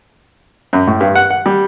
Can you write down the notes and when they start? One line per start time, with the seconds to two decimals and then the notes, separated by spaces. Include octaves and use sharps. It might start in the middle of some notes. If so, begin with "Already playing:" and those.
0.73 F#2
0.87 A2
1.01 G2
1.16 F#5
1.31 F#5
1.46 G3